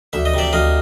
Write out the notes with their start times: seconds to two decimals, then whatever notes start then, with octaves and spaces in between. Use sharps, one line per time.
0.13 D2 E5
0.25 D#5
0.34 C3 D5 E5
0.53 D2 D#5 F5